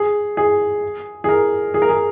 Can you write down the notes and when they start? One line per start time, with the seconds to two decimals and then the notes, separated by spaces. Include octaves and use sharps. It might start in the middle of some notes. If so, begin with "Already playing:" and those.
Already playing: G#4
0.37 G#4
1.24 G#4
1.29 A#4
1.74 G#4
1.82 A#4
1.89 G#4